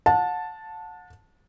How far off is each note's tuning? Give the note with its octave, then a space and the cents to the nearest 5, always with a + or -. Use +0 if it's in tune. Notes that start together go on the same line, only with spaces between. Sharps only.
F#5 -40 A5 +0